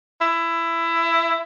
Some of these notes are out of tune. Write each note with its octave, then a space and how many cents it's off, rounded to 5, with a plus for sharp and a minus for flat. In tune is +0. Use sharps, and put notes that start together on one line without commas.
E4 +20